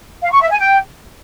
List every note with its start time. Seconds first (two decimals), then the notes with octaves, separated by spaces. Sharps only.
0.22 F5
0.31 C#6
0.41 E5
0.50 G#5
0.60 G5